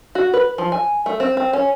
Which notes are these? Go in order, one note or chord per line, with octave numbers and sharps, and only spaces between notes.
F#4
B4
F3
G#5
A3
C4
C4
C#4